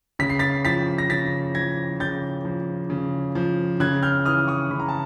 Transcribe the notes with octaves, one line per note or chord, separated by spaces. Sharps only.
C#3 B6
C7
A6 B6
F3 A6 B6
A#6
C#3 A6 B6
F3 G#6 A#6
C#3 G6 A6
F3
C#3
F3
C#3 F#6 G#6
F6 G6
E3 D#6 F6
C#6 D#6
C#3 B5
A#5
A5